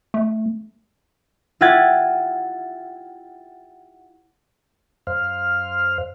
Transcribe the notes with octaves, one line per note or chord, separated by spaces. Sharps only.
A3
E4 F4 G4 F#5 G#6 A6
F#2 C5 F5 F6